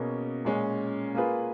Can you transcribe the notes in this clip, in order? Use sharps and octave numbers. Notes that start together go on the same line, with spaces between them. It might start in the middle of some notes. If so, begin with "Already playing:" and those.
Already playing: B2 A#3 C#4 G#4
A#2 G#3 C#4
A#3 F4 G#4 B4